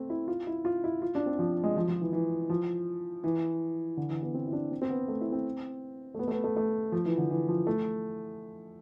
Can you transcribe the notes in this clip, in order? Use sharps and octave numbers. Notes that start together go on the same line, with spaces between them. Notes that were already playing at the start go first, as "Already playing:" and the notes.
Already playing: A3 C4
E4
F4
E4
F4
E4
F4
D4
C4
F3
G#3
F3
F3
E3
E3
F3
E3
D3
E3
B3
C4
E4
D4
C4
C4
B3
A3
E4
C4
A3
B3
A3
B3
A3
A3
F3
E3
D3
E3
F3
A3